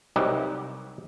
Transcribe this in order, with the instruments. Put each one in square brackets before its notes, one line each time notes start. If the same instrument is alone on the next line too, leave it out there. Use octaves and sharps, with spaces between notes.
[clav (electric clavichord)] C2 F#3 D#4 G4 B4